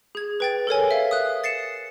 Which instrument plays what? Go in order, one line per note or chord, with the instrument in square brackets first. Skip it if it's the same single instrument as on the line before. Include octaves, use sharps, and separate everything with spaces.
[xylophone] G#4 G#6
B4 G5 A6
A4 A#4 C#5 G#5
E5 F5
D#6 F#6
A6 C7 C#7 E7